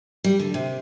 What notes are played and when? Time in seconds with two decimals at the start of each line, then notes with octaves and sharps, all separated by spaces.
0.24 G3
0.39 D3
0.54 C3